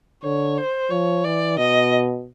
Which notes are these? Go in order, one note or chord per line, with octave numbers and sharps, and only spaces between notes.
D3 C#5
C5
F3 C#5
E3 D5
B2 D#5